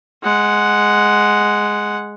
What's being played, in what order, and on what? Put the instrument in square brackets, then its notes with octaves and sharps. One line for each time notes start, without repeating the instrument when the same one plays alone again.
[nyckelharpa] G#3 F#5